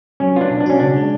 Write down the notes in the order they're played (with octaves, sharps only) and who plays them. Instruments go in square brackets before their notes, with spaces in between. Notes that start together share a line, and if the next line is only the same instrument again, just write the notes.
[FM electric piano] F#3 [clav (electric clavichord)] C#4
[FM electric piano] B3 [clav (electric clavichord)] F4
[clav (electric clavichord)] D4
[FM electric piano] B2
[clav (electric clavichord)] D4
[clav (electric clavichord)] C#4 [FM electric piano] F#4
[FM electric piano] C#3 [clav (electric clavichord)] D4
[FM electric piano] G#3